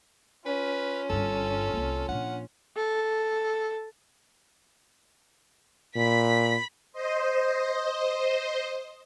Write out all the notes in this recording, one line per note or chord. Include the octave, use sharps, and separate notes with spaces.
C#4 F4 B4
G1 G2 A4
C2 A#3
A#1 D4 F#5
A4
A#2 B5 B6
C5 D#5